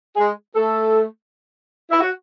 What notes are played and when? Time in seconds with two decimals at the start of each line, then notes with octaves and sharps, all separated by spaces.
0.16 G#3 G#4
0.55 A3 A4
1.91 E4
2.00 F#4